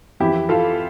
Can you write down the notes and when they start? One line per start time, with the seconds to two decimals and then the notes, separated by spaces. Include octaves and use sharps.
0.20 F2 E3 E4 G4
0.49 F4 A4